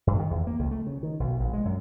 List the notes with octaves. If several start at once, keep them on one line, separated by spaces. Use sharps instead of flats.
G2
D#3
E2
A#3
C#2
A3
C#3
D#3
B1
A#1
G#3
F#2